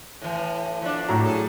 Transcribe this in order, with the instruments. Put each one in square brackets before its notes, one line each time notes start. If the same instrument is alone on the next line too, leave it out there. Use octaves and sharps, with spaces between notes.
[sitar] A2 E3
F3 B3 D4
[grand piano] A2 F#3 A#5
[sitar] G#4 A4